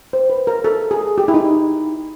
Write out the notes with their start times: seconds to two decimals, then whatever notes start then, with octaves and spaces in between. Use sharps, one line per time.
0.13 C5
0.30 B4
0.47 A#4
0.64 A4
0.91 G#4
1.18 G4
1.28 E4
1.34 D#4